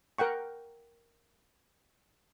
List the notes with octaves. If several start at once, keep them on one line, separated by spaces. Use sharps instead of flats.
A#4 F#5 G5 C#6